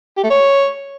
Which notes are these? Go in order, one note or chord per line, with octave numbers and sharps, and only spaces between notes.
G4
A3
C#5